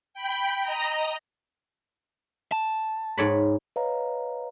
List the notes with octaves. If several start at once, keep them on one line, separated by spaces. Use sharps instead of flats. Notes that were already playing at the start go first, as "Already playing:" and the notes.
G5 B5
D#5 A#5
A5
G#2 C#5 B5
B4 C#5 D#5 F5 A#5